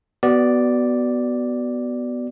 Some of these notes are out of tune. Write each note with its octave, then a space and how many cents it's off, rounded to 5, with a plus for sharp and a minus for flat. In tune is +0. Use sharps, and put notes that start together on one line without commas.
B3 +0 F#4 +30 D5 +0